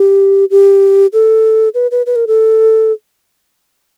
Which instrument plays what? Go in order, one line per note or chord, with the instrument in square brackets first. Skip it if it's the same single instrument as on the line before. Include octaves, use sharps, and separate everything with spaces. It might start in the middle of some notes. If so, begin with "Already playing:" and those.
Already playing: [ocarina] G4
G4
A4
B4
B4
B4
A#4
A4